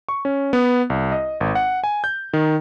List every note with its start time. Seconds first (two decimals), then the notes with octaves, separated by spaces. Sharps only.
0.09 C#6
0.25 C#4
0.53 B3
0.90 C2
1.12 D#5
1.41 G#1
1.55 F#5
1.84 G#5
2.04 G6
2.33 D#3